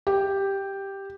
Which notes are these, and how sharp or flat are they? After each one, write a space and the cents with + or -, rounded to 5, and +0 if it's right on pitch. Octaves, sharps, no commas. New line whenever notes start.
G4 +0